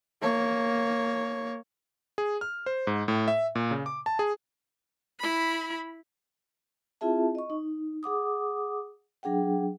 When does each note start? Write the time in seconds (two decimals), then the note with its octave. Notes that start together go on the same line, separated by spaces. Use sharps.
0.22 A#3 C#5
2.18 G#4
2.41 F6
2.66 C5
2.87 G#2
3.08 A2
3.28 E5
3.55 A#2
3.71 C#3
3.86 D6
4.06 A5
4.19 G#4
5.20 E4 B5
7.01 C4 E4 F4 G#4 E5 A5
7.35 D#5 C#6
7.50 D#4
8.03 G#4 F#5 D6 D#6
9.23 F#3 D4 G#4 F#5 G5